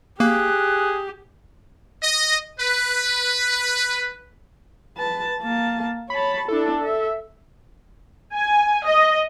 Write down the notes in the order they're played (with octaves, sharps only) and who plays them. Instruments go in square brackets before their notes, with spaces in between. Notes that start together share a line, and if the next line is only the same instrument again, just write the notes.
[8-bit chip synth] A#3 [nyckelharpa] G4 [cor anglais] G#4 [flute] F#6
[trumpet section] D#5
B4
[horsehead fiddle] B4 A5
A#3 A5
[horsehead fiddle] C#5 A5 [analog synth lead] B5
[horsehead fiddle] D4 E4 [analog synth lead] A4
[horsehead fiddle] E5
[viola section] G#5
D#5